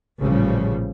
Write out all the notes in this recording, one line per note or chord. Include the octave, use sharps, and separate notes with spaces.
A1 A#2 C#3 F3 G3